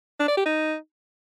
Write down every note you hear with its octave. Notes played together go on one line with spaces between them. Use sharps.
D4
D5
G4
D#4